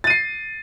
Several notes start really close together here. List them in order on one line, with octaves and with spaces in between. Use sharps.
A6 D#7 C7